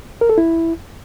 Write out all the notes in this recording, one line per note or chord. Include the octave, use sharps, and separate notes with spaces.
A#4
A4
E4